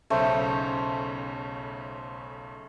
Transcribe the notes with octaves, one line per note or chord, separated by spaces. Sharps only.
B1 C#3 A3 C#4 C5